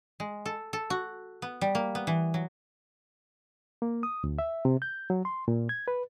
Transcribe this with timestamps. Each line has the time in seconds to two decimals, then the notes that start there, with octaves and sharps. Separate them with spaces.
0.20 G#3
0.46 A4
0.73 A4
0.90 F#4
1.42 B3
1.61 G3
1.75 A#3
1.95 B3
2.07 E3
2.34 F#3
3.82 A#3
4.03 D#6
4.24 D2
4.39 E5
4.65 C3
4.82 G6
5.10 F#3
5.25 C6
5.48 A#2
5.69 G#6
5.88 B4